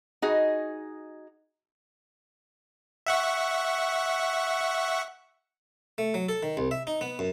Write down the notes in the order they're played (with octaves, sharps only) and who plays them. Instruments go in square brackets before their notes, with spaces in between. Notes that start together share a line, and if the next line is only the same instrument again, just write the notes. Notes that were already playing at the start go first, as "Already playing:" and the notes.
[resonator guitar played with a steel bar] D#4 F#4 G#4 D#5
[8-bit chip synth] E5 F#5 C#6
[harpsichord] A3
F#3
A4
D#3
C2
E5
D#4
B3
F#2